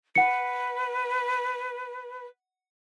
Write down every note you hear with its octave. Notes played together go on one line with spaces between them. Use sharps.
B4 F#5 C#7